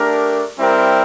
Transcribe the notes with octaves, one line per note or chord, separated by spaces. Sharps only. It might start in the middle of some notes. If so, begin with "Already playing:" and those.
Already playing: A3 D4 G4 A#4
G3 C4 E4 G4 A#4